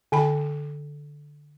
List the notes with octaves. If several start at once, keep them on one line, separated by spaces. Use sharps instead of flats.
D3 G5 B5